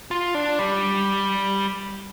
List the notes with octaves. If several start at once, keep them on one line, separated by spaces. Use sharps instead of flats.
F4
D4
G3